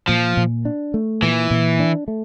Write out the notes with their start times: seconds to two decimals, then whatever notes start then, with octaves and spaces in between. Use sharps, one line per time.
0.08 A#2 F3
0.37 A#2
0.65 D4
0.94 A3
1.22 A#2 E3
1.51 A#2
1.80 D4
2.08 A3